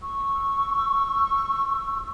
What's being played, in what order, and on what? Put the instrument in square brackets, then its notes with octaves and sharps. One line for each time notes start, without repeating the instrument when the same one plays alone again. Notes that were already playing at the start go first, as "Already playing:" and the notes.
[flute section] C#6 E6